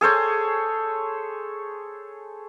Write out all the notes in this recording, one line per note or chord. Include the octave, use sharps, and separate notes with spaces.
G#4 A4 C5 C#5